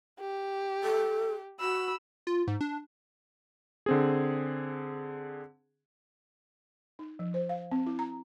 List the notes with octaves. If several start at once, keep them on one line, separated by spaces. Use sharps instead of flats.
G4
A4
F#4 B5 E6
F4
G#2
D4
D3 C4 G#4
D#4
F3
C5
F5
C4
E4
A#5